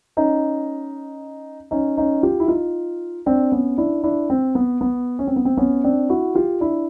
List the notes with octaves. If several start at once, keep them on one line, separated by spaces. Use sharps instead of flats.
C#4 D#4
C#4 D#4
C#4 D#4
F4 G4
E4
D#4 F4
C4 D4
B3 C#4
D4 E4
D4 E4
C4
B3
B3
C#4
C4
B3
C4
B3 C#4
C4 D4
E4 F#4
F4 G4
D4 E4